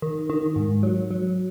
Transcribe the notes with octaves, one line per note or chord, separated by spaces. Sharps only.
D#3
D#3
G#2
F#3
F#3